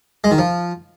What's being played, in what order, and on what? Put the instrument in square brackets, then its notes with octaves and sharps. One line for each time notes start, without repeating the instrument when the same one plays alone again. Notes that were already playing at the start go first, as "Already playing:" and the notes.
[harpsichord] G#3
D#3
F3